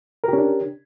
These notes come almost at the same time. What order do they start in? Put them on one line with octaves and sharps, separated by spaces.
A#4 G4 C#4 D4